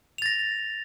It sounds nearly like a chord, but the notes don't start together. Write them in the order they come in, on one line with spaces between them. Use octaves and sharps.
F7 A6 A#6